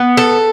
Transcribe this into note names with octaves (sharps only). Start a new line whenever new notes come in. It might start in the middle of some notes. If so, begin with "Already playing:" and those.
Already playing: B3
A4